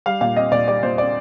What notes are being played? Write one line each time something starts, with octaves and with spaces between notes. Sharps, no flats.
G3 F5
A#2 F5
C4 D#5
A#2 D5
G3 D5
A#2 C5
C4 D5